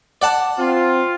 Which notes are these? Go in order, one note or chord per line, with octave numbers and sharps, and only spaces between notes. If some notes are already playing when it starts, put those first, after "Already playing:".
D5 F#5 A5
C4 F4